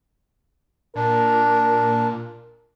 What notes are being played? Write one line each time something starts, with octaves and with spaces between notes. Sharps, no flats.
A#2 D4 A#4